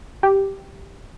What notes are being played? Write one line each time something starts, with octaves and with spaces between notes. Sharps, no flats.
G4